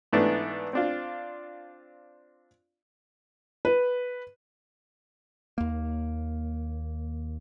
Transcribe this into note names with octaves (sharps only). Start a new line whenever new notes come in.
G#2 E3 A3 B3 D4
C4 D4 F4
B4
D#2 A#3